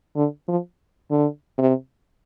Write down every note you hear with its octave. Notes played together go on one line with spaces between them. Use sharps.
D3
F3
D3
C3